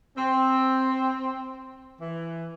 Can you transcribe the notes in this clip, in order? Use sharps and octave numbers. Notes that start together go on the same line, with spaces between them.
C4
E3